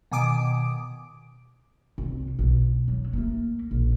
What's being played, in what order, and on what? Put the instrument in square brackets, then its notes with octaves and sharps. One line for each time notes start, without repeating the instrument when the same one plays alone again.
[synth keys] B2 D#3 G#5 D6 D#6 D7
[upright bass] C2
B1
F#3
A3 A#3
A#1